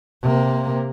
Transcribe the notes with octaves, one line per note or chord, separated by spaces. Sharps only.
C3 A#3